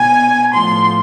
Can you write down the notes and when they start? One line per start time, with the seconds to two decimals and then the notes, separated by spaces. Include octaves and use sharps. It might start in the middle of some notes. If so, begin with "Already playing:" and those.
Already playing: B2 G#5
0.53 A2 F3 C6